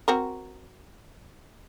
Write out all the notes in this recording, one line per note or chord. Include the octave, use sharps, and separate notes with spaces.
C4 F#4 A#4